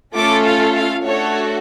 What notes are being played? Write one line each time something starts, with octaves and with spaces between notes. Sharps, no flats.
A3 C#4 F4 A4 D6
F5
F5
A3 D4 F#4 A4 C#5